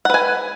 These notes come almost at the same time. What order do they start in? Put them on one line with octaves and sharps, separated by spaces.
F#5 B4 G#5